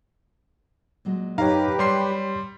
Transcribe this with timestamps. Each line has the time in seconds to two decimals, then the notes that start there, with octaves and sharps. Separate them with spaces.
1.05 A#2 F#3 G#3
1.38 F#2 D#4 G4 B4 C#5 F5 A#5
1.79 G3 C#5 C6 C7